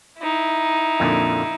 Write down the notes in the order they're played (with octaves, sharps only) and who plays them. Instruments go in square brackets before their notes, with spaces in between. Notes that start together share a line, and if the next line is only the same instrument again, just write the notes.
[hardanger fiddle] D#4 E4
[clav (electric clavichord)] F2 A#2 D3